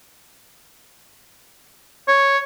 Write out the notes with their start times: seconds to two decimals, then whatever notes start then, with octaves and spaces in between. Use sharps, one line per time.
2.08 C#5